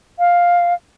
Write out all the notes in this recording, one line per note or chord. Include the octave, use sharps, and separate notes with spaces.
F5